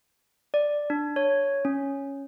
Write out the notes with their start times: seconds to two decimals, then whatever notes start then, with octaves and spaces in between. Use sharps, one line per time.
0.54 D5
0.90 D4
1.16 C#5
1.65 C#4